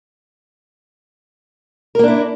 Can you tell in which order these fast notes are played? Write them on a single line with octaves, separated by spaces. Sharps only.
A#4 A#3 D4 E4